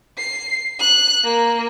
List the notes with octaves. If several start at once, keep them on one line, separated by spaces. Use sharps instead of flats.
C7
F#6
A#3